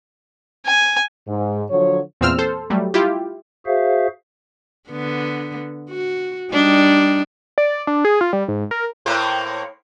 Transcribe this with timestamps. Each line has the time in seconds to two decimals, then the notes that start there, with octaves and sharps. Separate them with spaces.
0.66 G#5
1.28 G#2
1.70 D3 F3 F#3 C#5
2.21 E2 A#2 C4 E6 F6
2.38 A4 C5
2.70 F#3 G3 A3
2.94 E4 F4 G4
3.66 F#4 G#4 C5 E5 F5
4.90 D3 B3
5.90 F#4
6.52 G3 D4 D#4
7.58 D5
7.87 D4
8.05 G#4
8.21 F4
8.33 G3
8.48 G#2
8.71 A#4
9.06 A2 A#3 C5